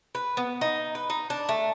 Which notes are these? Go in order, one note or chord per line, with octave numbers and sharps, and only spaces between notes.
B4
B3
D#4
B4
D#4
D4
A3